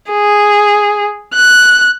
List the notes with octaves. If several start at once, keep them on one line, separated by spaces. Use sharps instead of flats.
G#4
F#6